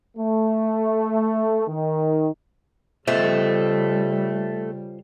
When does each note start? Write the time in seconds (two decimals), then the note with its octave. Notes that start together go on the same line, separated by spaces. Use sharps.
0.17 A3
1.67 D#3
3.08 C#3 G3 A3 F4 C5 D#5